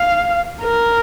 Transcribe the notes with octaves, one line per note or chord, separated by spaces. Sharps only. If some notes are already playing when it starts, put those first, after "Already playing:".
Already playing: F5
A#4